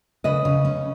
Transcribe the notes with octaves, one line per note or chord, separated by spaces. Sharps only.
C#3 B4 D#5
C#3
C#4